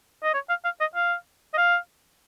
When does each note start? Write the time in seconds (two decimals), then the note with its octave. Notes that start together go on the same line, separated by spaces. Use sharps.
0.23 D#5
0.34 C#5
0.49 F5
0.65 F5
0.80 D#5
0.96 F5
1.54 D#5
1.58 F5